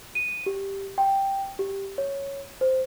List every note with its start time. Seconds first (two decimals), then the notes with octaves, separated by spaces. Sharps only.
0.15 D#7
0.46 G4
0.98 G5
1.59 G4
1.98 C#5
2.61 C5